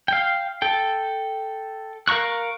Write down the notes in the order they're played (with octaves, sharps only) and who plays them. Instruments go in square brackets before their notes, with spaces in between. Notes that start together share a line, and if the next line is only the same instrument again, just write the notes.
[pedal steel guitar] F5 G5
A4 G5
A#4 F5 A#5 C#6 F#6